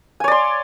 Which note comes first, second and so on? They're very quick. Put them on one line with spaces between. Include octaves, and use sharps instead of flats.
G#5 C#5 D5 C6